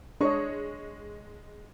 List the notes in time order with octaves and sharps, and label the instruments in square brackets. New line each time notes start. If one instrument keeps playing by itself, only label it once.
[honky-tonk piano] G#3 C#6 [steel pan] D4 C#5 D#5